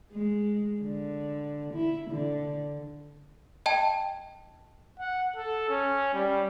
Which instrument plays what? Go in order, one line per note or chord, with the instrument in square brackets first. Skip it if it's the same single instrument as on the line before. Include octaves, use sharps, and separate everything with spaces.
[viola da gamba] G#3
D3
E4
D3
[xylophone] D#5 G5 A5
[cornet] F#5
A4
C#4
G3